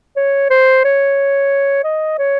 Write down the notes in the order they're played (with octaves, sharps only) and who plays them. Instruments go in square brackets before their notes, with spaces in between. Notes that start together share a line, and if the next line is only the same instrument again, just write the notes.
[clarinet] C#5
C5
C#5
D#5
C#5